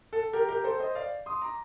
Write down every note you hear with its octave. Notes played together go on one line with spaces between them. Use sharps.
A4
G4 A#4
G4 A#4
A4 C5
C5 D#5
D5 F5
C6 D#6
A#5 D6